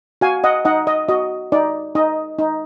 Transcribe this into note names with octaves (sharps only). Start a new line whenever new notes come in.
F#4 F5 G#5
D#5 F#5
D#4 D#5 F#5
D#5
F#4 D#5
D#4 D5
D#4 D#5
D#4